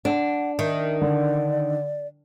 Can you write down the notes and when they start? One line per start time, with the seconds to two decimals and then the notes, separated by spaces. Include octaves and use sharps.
0.05 D4 F#5
0.59 D#3 E5
1.01 D3 D5